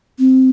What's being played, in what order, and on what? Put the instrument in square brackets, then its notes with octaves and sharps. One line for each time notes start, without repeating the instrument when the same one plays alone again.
[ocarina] C4